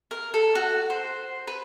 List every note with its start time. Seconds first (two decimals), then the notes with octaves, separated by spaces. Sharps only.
0.11 A#4
0.34 A4
0.55 F#4
0.90 C5
1.47 B4